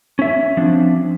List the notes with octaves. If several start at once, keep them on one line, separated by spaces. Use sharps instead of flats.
C#4 E5
F3 C4 D4